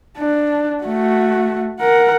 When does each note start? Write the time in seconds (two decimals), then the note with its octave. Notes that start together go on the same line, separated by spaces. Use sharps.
0.18 D4
0.84 A3 F#4
1.80 A#4 F#5